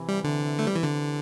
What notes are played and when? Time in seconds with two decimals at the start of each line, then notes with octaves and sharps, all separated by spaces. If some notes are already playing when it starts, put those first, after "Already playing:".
Already playing: C3 E3
0.09 G3
0.24 D3
0.59 A3
0.67 G3
0.75 E3
0.83 D3